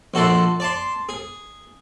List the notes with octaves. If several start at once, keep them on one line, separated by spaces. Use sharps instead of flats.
A#1 F#4 A4 D5 C6
D5 A5 C6
G#4